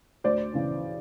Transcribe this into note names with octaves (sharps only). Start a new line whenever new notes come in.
D2 C5 D5
C#3 E3